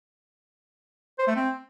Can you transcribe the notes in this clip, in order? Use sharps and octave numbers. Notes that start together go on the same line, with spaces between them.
C5
A3
C4